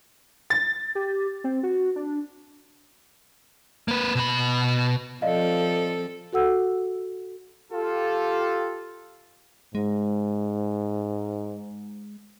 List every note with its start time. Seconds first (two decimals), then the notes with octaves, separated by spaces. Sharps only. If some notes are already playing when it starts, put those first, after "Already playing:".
0.50 A6
0.95 G4
1.44 C4
1.63 F#4
1.96 D4
3.88 A#3 B4
4.15 B2 B5
5.22 F3 C4 A4 D5 D#5 F5
6.33 F#4 A4 F#5 E6
7.72 F4 G4 A4
9.75 G#2 G#3